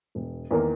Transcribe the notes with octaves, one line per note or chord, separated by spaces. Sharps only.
E1
E2 D#3 A#3